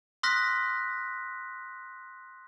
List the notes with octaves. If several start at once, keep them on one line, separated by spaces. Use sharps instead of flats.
C6 D#6 F6 F#6 A#6 B6